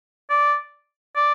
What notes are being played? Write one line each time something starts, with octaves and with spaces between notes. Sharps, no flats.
D5
D5